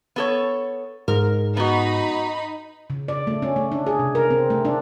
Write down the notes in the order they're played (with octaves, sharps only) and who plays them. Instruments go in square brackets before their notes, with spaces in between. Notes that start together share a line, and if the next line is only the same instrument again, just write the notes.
[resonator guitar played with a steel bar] B3 A4 C#5
[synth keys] G#2 [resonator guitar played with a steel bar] A#4
[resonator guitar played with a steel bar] B3 F#4 [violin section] D#4 B5
[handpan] C#3
D5
A3
C#4
A3
D4
G#4
C3
A#4
C4
A3
D4